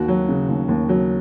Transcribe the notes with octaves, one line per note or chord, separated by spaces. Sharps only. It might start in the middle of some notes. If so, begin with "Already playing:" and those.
Already playing: D#2 F#4
F#3
C#3
D#2
D#2
F#3